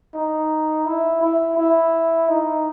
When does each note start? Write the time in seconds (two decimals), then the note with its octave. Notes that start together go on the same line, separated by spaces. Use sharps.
0.14 D#4
0.86 E4
1.21 E4
1.57 E4
2.28 D#4